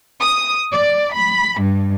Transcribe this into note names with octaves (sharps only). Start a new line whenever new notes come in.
D#6
D5
B5
G2